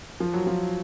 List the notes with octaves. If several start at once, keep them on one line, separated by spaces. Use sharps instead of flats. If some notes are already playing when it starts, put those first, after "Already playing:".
F3
F#3
F3